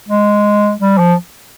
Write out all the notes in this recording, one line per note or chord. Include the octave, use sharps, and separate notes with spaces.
G#3
G3
F3